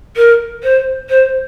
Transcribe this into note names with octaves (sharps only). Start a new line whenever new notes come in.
A#4
C5
C5